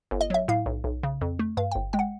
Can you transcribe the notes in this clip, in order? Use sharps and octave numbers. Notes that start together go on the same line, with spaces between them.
G1
D#5
F#3 E5
A2 F5
B1
B1
C#3
F2
A3
G2 F5
G1 G5
G#3 G5
F#5